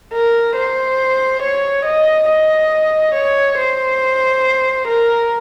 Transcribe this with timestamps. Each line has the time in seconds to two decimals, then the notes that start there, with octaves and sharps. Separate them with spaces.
0.13 A#4
0.56 C5
1.42 C#5
1.85 D#5
2.29 D#5
3.15 C#5
3.58 C5
4.88 A#4